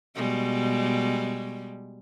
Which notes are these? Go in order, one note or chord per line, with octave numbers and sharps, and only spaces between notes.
B2 G3 G#3